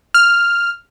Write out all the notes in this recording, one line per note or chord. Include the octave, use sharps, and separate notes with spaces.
F6